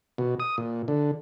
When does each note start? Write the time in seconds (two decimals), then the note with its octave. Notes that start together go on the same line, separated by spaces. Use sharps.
0.18 B2
0.40 D#6
0.58 A#2
0.88 D3